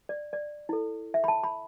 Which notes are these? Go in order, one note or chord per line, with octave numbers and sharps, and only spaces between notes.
D5
D5
E4 A4
E5
B5
A5
B5